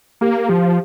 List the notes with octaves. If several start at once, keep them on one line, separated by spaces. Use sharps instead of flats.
A#3 G4
F3 G4